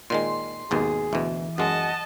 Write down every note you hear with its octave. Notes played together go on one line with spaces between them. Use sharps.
A#2 D#3 G#3 C6
G#1 D#2 B2 G#4
D2 B2 E3
F#2 G#3 D#5 F#5 A5